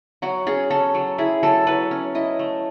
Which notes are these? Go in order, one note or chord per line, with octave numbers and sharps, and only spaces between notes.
F#3 F#4
C#4 G#4
C#4 A4
F#3
E4 G#4
F#3 A4
F#3 B4
C#4
E4 D#5
A3